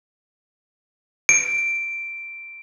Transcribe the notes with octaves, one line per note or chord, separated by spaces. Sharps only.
D7